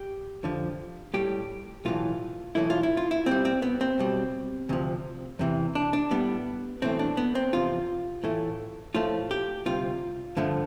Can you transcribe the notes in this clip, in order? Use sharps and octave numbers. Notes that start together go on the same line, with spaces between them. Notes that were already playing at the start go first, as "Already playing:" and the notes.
Already playing: G4
F2 D3 F3
A2 G3 G4
B1 A2 E3 F4
B1 A2 E3 A3 E4
F4
E4
F4
E4
C2 C3 G3 C4
C4
B3
C4
B1 B2 G3
D2 C3 F3
E2 C3 E3
D4
D4
A2 G3 B3
B1 A2 E3 A3 C4
D4
B3
C4
E2 C3 F3 F4
A2 E3 A3
A2 F3 A3 F4
G4
D2 C3 G3 F4
G2 D3 F3 A3